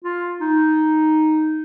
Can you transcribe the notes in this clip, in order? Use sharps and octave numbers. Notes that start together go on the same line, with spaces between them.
F4
D#4